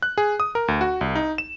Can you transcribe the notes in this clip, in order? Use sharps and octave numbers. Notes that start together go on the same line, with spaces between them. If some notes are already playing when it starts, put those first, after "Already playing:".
F#6
G#4
D#6
A#4
D2
F#4
C2
D#4
E7